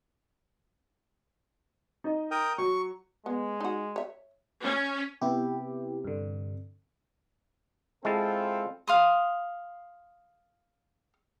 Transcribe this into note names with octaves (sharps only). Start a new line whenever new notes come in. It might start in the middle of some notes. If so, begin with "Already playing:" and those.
D#4 D#5
A#4 G5 D#6
F#3 C#6
G#3 B3
D#4 F#4
C#5 E5
C#4
C3 B3 E4 G4
G2 D3
G#3 C4 E4 F4 A4 A5
F5 C6 D#6